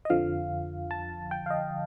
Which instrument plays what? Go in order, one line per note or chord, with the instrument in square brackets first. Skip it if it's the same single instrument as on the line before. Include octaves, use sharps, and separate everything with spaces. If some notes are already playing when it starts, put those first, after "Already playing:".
[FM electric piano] D#5
F2 D3 F3 F5
A5
G5
F5
D#5